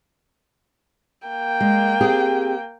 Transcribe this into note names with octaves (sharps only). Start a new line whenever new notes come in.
A#3 G5
G#3
C4 G4 G#4